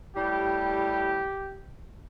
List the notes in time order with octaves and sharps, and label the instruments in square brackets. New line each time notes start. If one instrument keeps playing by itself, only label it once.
[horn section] A2 G3 G4